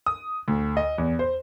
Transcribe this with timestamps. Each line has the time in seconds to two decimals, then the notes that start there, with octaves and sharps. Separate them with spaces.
0.06 D#6
0.48 D2
0.77 D#5
0.98 E2
1.19 C5